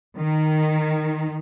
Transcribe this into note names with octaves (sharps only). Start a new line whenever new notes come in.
D#3